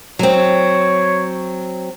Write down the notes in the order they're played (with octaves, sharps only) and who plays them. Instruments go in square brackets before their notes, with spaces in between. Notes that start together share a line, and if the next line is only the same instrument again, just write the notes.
[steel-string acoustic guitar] F#3 C4 [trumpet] C#5